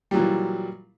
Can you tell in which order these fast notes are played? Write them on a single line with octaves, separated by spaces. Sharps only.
G3 F#3 A#2 E3